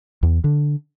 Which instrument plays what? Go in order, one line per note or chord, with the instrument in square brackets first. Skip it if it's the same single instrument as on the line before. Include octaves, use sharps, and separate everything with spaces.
[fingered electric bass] E2
D3